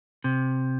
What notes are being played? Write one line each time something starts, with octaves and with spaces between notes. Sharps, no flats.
C3